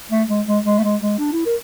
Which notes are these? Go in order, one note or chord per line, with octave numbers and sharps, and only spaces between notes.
A3
G#3
G#3
G#3
A3
G#3
G#3
D4
E4
A#4